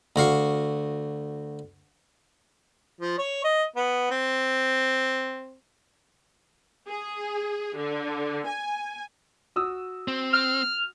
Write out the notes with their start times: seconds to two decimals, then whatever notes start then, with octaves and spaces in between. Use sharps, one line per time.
0.16 D2 F#4 F5 C#6
3.01 F3
3.18 C#5
3.44 D#5
3.76 B3
4.11 C4
6.88 G#4
7.76 D3
8.47 G#5
9.56 F#4 D#6 E6
10.08 C4
10.33 F6